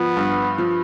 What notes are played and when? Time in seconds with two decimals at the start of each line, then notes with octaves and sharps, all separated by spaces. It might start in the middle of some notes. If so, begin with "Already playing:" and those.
Already playing: F3 B3
0.17 G2
0.58 F3